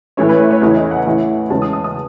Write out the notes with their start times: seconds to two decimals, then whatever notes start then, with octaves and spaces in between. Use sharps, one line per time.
0.17 A2 E3 A3 C#4 C#5
0.29 B4
0.39 C#5
0.51 C#5
0.62 E2 C#3 E3 A3 C#4
0.77 D#5
0.91 F#5
1.06 A2 E3 A3 C#4
1.50 E2 C#3 G#3 C#4 A5
1.62 D#6
1.73 D#6
1.84 D#6